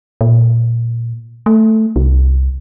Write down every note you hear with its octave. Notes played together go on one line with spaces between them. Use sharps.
A#2
A3
C2